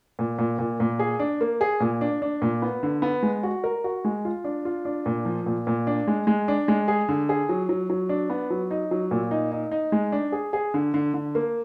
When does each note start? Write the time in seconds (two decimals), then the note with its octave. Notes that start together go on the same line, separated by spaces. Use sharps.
0.19 A#2
0.39 A#2
0.59 A#2
0.80 A#2
0.99 G#4
1.19 D4
1.41 A#3
1.61 G#4
1.80 A#2
2.01 D4
2.22 D4
2.42 A#2
2.62 B3
2.83 D3
3.02 B3
3.23 G#3
3.43 F#4
3.64 A#4
3.84 F#4
4.05 G#3
4.25 F4
4.44 D4
4.65 F4
4.85 D4
5.06 A#2
5.25 F3
5.46 A#2
5.67 A#2
5.87 D4
6.07 G#3
6.27 G#3
6.48 D4
6.68 G#3
6.88 G#4
7.09 D3
7.29 G#4
7.49 F#3
7.69 F#3
7.90 F#3
8.09 D4
8.30 B3
8.50 F#3
8.71 D#4
8.91 F#3
9.11 A#2
9.31 D#4
9.52 D#4
9.71 D#4
9.92 G#3
10.12 D4
10.32 G#4
10.53 G#4
10.74 D3
10.94 D3
11.14 D3
11.35 A#3